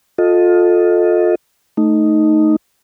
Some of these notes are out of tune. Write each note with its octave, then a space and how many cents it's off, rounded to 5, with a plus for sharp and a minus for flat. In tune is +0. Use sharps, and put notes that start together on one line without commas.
F4 +25 A4 +0 D#5 +0
A3 +0 D#4 +0